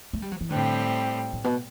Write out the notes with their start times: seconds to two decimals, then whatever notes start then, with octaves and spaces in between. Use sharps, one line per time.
0.13 A3
0.22 G3
0.32 F#3
0.41 E3
0.50 A2 D3 G3 C4
1.33 A2
1.44 B2